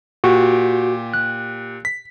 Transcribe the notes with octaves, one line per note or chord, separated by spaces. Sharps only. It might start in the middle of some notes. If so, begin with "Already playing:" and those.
A#2 F#4 G4
F#6
B6